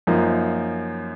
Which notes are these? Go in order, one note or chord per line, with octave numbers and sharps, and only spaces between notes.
F#2 F3 A#3 D#4